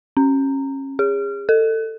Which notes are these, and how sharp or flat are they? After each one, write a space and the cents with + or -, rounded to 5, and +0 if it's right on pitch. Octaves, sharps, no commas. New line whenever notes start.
C#4 -25
G#4 -35
A4 +25